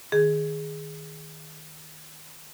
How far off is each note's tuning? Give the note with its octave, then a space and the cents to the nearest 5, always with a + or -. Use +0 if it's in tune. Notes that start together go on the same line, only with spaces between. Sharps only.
D#3 -5 G#4 +0